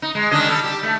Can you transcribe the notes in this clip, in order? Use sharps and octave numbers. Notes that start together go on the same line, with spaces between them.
D#4
G#3
D#3 D4 D#5
G3 A4
G4
A3